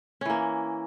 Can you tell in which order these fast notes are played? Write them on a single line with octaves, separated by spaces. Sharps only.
C#4 E3 A#3